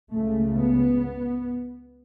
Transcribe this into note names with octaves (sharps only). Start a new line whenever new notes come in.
C#2 C#3 A3
B3